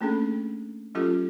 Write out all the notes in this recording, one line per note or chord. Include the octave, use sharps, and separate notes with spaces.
A3 A#3 C#4 D4 G#4 A4
F#3 C#4 F4 G4 A4